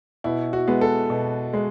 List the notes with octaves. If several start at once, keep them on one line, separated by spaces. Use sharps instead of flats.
B2 E4
F#4
G#3 B3
A4
B2
G#3